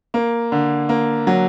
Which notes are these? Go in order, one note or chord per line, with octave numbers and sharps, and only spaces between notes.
A#3
D3
A#3
F#3